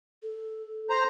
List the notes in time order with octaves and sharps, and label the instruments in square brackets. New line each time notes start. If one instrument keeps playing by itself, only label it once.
[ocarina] A4
[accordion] C5 A#5